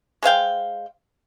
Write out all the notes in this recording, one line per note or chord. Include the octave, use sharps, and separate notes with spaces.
G#3 C5 F5 G5